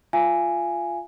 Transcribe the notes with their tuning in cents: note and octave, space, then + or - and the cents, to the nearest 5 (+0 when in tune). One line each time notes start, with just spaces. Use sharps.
F4 -5 F5 -35 G#5 +0